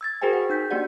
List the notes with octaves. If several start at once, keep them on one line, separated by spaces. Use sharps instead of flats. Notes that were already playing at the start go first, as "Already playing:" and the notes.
E6 G#6 A6
F#4 G#4 A#4 C5 G5 G#5
F#5
D#4 G6 B6
A#3 D4 F#4 G4 D5 F#5